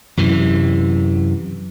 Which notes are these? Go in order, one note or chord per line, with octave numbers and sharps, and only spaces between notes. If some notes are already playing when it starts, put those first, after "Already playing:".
F#2 C3 E3